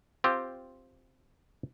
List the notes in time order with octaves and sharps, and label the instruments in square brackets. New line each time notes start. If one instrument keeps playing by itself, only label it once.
[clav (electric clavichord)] C4 F4 G4